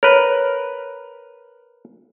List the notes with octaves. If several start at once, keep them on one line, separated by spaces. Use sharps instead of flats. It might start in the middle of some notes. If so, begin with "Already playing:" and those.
A#4 B4 C#5